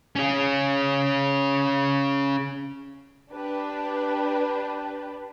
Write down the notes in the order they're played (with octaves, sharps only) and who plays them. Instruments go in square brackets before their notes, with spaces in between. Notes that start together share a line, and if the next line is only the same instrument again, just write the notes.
[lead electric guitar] C#4 G#4
[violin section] D4 G4 B4